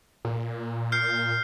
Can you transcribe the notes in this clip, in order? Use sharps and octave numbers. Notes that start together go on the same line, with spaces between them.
A#2
F6 G6 C7